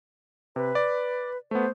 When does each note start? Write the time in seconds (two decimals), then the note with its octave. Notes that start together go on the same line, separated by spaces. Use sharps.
0.56 C3 B4
0.75 D5
1.51 A3 B3 C5